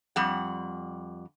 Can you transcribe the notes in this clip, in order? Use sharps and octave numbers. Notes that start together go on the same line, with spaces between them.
F2 G3 F#5